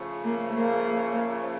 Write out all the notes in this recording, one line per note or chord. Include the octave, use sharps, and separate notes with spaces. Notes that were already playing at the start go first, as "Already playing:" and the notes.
Already playing: C#3 F3 A3
A#3
A#3